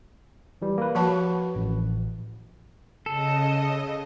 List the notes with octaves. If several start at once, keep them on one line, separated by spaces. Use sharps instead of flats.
E3 G3
A#3 B4
F3 F#4 B4 F#5 A5
A1
C#3 A4 D#5